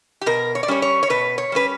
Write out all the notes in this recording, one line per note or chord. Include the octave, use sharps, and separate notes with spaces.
G4
B2 A#4
C#5
D5
G3 C#4 C#5
C#5
C#5
B2 B4
C#5
G3 C#4 B4